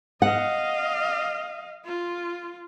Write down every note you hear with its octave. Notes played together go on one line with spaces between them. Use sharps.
D#5 F5 F#5
F4